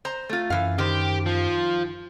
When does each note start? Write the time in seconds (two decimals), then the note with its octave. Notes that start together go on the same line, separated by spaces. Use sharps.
0.05 C5 A#5
0.29 A3 F4
0.50 F#2 E3 F5
0.78 D#3 G4 C5
1.26 F3